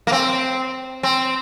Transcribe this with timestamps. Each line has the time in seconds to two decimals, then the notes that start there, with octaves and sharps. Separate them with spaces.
0.07 A#3
0.12 C4
1.03 C4